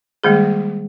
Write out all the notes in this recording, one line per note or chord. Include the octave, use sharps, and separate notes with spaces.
D#3 G3 G#3 A#3 G#4